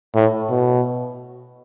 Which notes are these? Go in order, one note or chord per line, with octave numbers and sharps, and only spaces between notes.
A2
B2